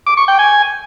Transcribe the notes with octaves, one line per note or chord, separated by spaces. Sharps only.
D6
C#6
G5
G#5